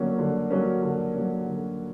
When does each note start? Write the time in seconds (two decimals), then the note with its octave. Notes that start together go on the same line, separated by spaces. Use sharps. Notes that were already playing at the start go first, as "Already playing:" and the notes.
Already playing: D3 F#3 A#3 C#4
0.18 D3
0.51 F#3 A#3 C#4
0.83 D3
1.14 F#3 A#3 C#4
1.47 D3